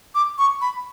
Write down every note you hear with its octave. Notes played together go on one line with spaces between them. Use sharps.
D6
C#6
B5